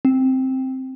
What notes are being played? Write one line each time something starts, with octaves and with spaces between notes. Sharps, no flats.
C4